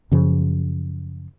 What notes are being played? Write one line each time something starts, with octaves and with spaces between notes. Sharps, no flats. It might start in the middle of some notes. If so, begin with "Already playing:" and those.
F#2 C#3 F3